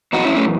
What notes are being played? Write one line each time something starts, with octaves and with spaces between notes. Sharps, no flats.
F#2 E3 D#4 F#4
C#4 E4
A3 C#4